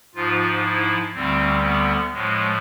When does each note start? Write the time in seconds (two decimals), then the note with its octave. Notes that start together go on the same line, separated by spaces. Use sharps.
0.15 G#2 F3 F4
0.64 E4
1.14 D2 D3 G3 C4
1.63 B3
2.13 A2 F3 G#3